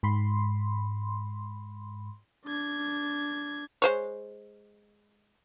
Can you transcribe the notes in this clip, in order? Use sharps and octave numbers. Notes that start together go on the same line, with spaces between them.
G#2 B5 C6
D4 G#6
G#3 C5 C#5